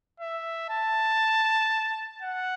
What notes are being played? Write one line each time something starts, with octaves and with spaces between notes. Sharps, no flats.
E5
A5
F#5